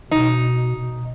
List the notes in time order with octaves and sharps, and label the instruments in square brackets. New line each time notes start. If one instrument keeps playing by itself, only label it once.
[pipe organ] B2 [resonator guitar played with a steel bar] D#4